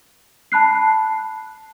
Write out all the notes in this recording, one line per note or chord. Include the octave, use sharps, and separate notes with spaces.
A5 B5 F#6 C7